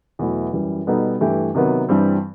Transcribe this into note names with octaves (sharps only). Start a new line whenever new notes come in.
E2 B2 F#3 A3 E4
F#2 E3 G3
B2 G3 B3 D#4 A4
G2 E3 A3 E4 G4
C3 D#3 F#3 B3
G2 E3 G3 C4